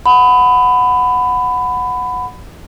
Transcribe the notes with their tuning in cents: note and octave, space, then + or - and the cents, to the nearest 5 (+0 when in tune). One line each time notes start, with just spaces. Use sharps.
F#5 -10 B5 +20